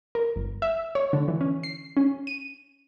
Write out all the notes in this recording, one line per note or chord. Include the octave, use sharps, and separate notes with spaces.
A#4
G1
E5
C#5
D3
E3
C#4
C7
C#4
D#7